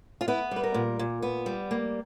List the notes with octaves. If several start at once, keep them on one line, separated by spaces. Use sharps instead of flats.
F4
B3 E4
G3 B4
A#4
A#2
A#2
B3
G3
A#3